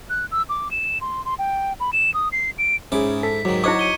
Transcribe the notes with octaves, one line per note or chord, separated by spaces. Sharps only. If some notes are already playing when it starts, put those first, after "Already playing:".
F#6
E6
D6
E7
C6
C6
G5
B5
E7
D#6
C7
D7
G#2 C#4 E4 G#4 D6
A4 B6
G#2 D#3 F#3 D6
D#4 E4 C5 C#6 D6 G#6 C#7
C#7 D#7 G7